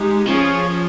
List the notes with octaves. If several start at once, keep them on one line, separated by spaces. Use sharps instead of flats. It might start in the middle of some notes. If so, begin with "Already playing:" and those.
Already playing: G#3 D#4 G4
F3 C#4 F4 G#4 C#5